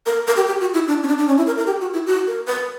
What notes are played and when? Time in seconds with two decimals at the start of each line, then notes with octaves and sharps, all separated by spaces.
0.06 A#4
0.27 A#4
0.37 G4
0.47 G4
0.60 F#4
0.74 E4
0.87 D4
1.03 C#4
1.08 D4
1.18 D4
1.27 C#4
1.37 E4
1.47 A#4
1.58 A#4
1.67 G4
1.81 F#4
1.93 E4
2.07 F#4
2.27 A#4
2.47 B4